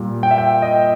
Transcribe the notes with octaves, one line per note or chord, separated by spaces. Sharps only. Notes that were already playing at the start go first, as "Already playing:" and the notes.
Already playing: A#2 G3
G5
E5
G5
D#5